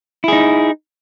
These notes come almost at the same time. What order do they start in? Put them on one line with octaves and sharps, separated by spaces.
E4 G#4 D#4